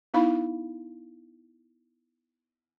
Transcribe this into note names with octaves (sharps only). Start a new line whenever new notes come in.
B3 D#4 E4 F5 B5